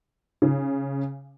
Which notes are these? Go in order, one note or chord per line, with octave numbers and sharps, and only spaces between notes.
C#3